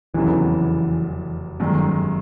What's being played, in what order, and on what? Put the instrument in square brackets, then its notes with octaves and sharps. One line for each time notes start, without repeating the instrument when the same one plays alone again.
[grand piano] F1 E2 C#3 F#3 [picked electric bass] E3
[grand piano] G1 F#2 D#3 G#3